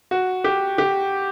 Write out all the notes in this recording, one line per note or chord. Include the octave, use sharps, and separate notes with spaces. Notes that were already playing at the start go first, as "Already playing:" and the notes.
F#4
G4
G4